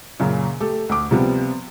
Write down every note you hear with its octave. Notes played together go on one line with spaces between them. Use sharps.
F#2 A#2 C#3
A3 G4 A4
D2 D6
C3 F3 G3 B3